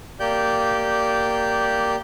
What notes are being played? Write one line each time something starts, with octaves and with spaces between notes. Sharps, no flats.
A#3 G4 D5 G6